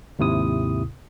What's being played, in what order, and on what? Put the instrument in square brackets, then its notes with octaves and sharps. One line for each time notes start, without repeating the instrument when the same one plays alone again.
[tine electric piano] D#2 G#2 C3 E4 D#6